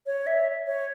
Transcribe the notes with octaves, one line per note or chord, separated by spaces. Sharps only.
C#5
E5
C#5